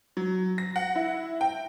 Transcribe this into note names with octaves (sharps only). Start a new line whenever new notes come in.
F#3
A#6
F#5
E4
G5